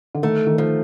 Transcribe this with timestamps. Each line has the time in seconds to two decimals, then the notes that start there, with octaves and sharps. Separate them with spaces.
0.15 D3
0.23 D#3 A3
0.47 D#3
0.58 F3